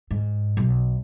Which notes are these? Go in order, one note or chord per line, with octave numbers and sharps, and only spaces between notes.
G#2
B1